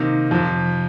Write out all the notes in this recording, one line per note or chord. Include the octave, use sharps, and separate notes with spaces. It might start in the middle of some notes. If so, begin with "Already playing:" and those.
Already playing: C3 D#3 A#3 D#4
F2 C3 F3